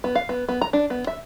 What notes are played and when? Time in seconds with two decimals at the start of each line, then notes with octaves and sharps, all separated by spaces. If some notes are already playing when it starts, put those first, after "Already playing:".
0.04 B3
0.15 F5
0.29 B3
0.49 B3
0.61 A#5
0.73 D4
0.90 B3
1.07 E5